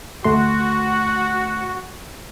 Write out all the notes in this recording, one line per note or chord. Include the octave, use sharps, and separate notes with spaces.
D2 A3 F#4 C6